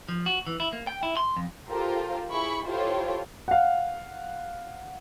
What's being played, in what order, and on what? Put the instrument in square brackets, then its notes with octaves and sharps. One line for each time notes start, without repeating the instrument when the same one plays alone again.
[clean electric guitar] F3
F#4
E3
E4
A#3
G5
E4
C6
F2
[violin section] F4 G4 A4 A#4 C5
E4 G#4 B5 C#6
E4 F4 G4 A4 C5 C#5
[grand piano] F5 F#5